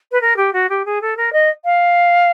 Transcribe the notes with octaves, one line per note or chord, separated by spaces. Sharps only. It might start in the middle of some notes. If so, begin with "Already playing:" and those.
B4
A#4
G4
F#4
G4
G#4
A4
A#4
D#5
F5